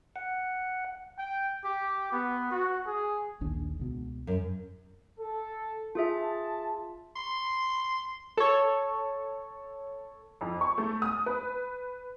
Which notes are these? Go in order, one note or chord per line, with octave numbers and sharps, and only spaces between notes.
F#5
G5
G4
B3
F#4
G#4
A#1 D#2 D4
C#2 B2
F#2
A4
F4 G#4 E5 A5
C6
A4 C#5
F2
C#6
A3
D#6
B4